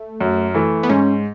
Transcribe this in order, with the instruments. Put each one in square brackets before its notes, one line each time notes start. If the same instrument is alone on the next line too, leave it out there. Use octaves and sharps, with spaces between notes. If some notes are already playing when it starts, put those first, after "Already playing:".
Already playing: [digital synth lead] A3
[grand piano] F#2
E3 A3
[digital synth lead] B3
[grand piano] G#2 [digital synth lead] C#4